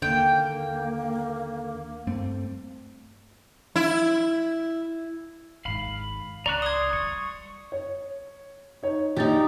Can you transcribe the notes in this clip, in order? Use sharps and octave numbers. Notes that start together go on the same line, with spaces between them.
D#2 D3 A#3 G5
G2 A3 C4
E4
G#1 G#2 F5 B5
C#2 D5 A#5 C#6 F#6
C6 D#6 G#6
G3 C#6
C#5
D#4 C#5
A#1 D#4 G4 A6